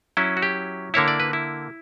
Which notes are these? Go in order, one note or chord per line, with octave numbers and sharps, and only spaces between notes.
F#3 C#4 E4
F#4
G4
D3 A#3 E4 C#5
D5
B4
E4